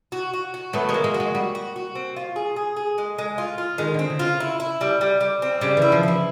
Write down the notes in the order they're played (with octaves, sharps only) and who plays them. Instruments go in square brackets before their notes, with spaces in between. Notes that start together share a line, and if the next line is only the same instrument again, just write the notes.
[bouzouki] F#4
F#4
F#4
[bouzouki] F#3 [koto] A3 B3
[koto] G#3 A#3
[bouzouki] F#3
[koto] G#3 A#3
[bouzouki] F#4
[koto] G#3
[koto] G3 [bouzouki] F#4
[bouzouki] F#4
F#4
C4
F4
G#4
G#4
G#4
G#3
G#3
F4
F4
[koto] D#3 [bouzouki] G#3
[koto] D3 [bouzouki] C4
[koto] C#3
[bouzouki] F4
E4
E4
G3
G3
G3
C4
[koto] C#3 [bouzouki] G3
[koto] E3 [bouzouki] E4
[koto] F3
[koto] E3 [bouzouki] E4